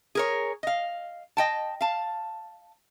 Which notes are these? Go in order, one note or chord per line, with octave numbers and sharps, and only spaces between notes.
G#4 A#4 C#5
D#5 F5
D#5 G5 A5
F5 A5